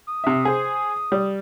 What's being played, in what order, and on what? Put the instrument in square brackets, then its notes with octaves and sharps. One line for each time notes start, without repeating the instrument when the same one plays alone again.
[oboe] D#6
[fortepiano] C3 E5
G#4 C5
G3